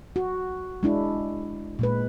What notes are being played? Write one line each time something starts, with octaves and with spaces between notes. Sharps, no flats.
F#4
G#3 D4 E4
A#2 G#3 B4